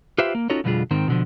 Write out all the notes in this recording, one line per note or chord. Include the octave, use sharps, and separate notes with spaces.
F4 G4 B4 C5 E5
A#3
C#4 D#4 F4 F#4 A4 C#5
F2 B2 D3 G3 F4 G#4
G#2 D#3 C4
B2 D3 F3